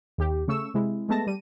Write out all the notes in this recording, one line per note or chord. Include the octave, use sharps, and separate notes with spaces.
D#2 G4
C#3 A3 C#6 E6 E7
C3 G#3 E4
G#3 A3 B3 A5 A#6
G3 D#7